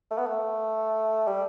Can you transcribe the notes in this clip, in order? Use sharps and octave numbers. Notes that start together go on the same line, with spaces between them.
A3
B3
A3
G3